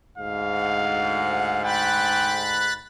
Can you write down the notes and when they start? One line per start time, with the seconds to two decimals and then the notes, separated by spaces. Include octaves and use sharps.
0.18 D2 G#2 F5
0.56 F#5
1.64 G5 B5 F#6 A6